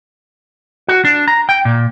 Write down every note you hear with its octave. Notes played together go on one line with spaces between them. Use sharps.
F#4
D4
A#5
G5
A#2